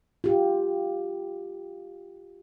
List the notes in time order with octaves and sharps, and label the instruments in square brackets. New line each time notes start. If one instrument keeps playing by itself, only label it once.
[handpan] F4 G4